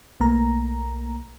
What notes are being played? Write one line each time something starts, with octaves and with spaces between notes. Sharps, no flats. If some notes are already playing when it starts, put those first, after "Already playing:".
B1 A3 A#3 A#5